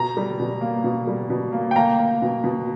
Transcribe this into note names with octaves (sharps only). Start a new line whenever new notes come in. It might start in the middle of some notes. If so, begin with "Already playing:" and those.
Already playing: B2 A#5
G3
B2
A#3
B2
G3
B2
A#3
G5
A#3 A#5
A#3
B2
B2